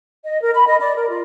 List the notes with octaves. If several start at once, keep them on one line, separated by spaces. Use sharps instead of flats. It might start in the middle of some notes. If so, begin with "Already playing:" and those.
D#5
A#4
B5
D#5
D5
A#4
F4